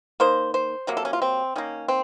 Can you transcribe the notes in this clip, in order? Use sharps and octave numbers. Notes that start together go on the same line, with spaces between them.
D#3 A#3 C5
C5
C3 F#3 A#3
A4
C#4
F4
C4
D#3 A#3 C#4
C4